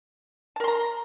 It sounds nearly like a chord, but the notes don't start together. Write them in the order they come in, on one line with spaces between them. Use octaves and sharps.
A5 A#4 C6 A#5